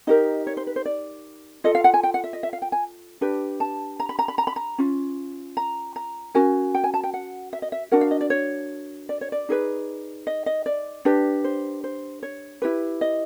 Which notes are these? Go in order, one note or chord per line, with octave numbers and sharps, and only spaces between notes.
D#4 G4 A#4 D#5
C#5
C5
B4
C5
D5
F4 A4 D#5
F5
F#5
G#5
G5
F#5
E5
D#5
E5
F5
G5
G#5
D4 G4 B4
A5
A#5
B5
A#5
B5
A#5
B5
A#5
C#4 F4
A#5
A#5
C#4 F#4 A#4 G#5
G5
G#5
A5
G5
F#5
E5
D#5
E5
D4 F#4 A#4 F#5
F5
D#5
D5
C#5
D5
C#5
D5
D#4 G#4 B4
D#5
D#5
D5
D4 G4 B4
C5
C5
C#5
E4 G4 B4
D#5